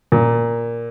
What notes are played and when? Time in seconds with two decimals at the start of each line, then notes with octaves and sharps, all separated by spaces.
0.12 A#2